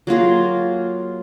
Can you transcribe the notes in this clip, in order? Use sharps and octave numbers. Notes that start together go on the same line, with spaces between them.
F#3 A#3 F4 G#4